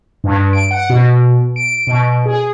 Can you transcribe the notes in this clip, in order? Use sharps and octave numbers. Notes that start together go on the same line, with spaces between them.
G2
D7
F#5
B2
D7
B2
G#4